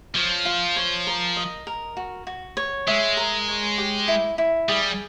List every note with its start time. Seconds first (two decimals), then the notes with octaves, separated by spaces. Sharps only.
0.15 F3 C#5
0.45 F4
0.76 C#5
1.07 A#4
1.36 D#5
1.67 A#4
1.97 F#4
2.27 F#4
2.57 C#5
2.88 G#3 E5
3.17 A#4
3.48 C#5
3.78 G4
4.08 E4
4.38 E4
4.68 G3 G#4